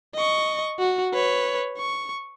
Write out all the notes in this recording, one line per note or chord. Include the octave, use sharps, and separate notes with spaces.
D#5 C#6
F#4
B4 C#5
C#6